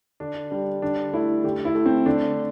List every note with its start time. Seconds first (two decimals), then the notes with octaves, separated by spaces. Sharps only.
0.20 D3 D4
0.51 G3 D4
0.82 D3 D4
1.13 A3 E4
1.44 D3 G4
1.65 E4
1.75 A3
1.86 C4
2.06 D3 D4